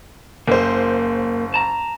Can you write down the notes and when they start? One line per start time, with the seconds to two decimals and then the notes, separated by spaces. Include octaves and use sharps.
0.47 F#1 A#3 C5
1.54 A5 A#5